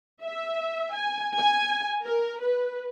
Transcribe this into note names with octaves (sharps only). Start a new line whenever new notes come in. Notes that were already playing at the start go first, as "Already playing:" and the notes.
E5
G#5
G#5
A#4
B4